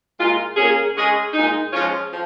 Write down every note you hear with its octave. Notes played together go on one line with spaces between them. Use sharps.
A#2 G#3 F4
A#2 A#3 C#4 G#4
G#3 C#4 G#4 D#5
A#2 G#3 D#4
F3 G#3 C#4 F4 C#5
F3